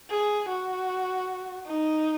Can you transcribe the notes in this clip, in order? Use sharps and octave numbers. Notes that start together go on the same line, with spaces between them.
G#4
F#4
D#4